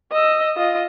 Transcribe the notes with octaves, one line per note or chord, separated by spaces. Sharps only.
D#5 E6
F4 D#5